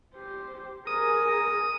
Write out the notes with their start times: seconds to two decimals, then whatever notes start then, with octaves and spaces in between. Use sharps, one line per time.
0.14 G4 C5
0.87 G#4 A#4 D#6